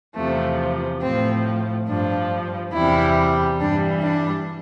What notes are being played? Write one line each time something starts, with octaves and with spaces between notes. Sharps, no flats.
E2 C3 F3 A3
A2 F3 C4
G2 F3 D4
E2 C3 G3 E4
G2 E3 G3 D4
D4